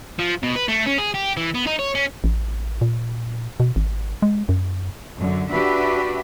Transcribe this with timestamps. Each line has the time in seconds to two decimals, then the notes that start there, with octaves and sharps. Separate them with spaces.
0.19 F3
0.43 B2
0.56 B4
0.68 A3
0.86 C#4
0.98 G#4
1.14 G4
1.37 E3
1.54 B3
1.67 D#4
1.79 C#5
1.95 C#4
2.24 A1
2.81 A#2
3.60 B2
3.76 G#1
4.22 G#3
4.49 F#2
5.16 F#2 D3
5.51 D4 F#4 G4 B4 E5